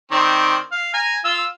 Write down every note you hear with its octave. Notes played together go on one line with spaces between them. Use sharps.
D#3 C4 D5
F5
G#5 A#5
F4 E6